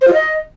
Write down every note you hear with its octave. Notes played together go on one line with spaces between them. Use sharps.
C5
F4
D#5